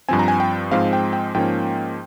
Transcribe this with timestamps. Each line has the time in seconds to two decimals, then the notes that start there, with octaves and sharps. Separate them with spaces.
0.09 G2 F3 C4 G#5
0.19 A#5
0.28 G#5
0.40 G5
0.71 G#2 F3 G#3 C4 F5
0.93 G5
1.13 G5
1.34 G#2 F3 A#3 C#4 G5